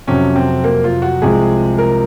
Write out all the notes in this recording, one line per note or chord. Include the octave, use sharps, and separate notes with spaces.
F2 C3 F#3 C#4
C4
A#3
F4
F#4
C2 C3 F3 G#3 G#4
A#4